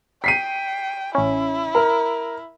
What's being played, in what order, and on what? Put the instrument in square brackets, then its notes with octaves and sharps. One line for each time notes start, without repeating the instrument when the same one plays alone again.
[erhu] G5 [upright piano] B6 C7 D#7
[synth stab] A1 C#4 [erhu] E4
[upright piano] A#4